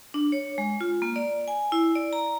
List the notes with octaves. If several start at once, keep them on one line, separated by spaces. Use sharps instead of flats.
D4
C#5
G#3
F4
A#3
D5
G#5
E4
D5
A#5